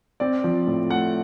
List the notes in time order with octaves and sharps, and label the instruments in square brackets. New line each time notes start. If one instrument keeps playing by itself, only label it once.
[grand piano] C4 D5
F3
A2
A3 F#5